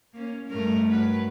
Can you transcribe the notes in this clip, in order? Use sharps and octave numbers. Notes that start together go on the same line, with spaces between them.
A#3 C#4
G2 A3 A#4
F#3 B4